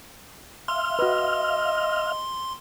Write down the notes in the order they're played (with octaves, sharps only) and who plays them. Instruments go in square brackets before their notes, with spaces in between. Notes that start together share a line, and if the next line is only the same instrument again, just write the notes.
[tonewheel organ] E5 F5 F6 [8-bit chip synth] C6
[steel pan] F#4 B4 [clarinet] D#5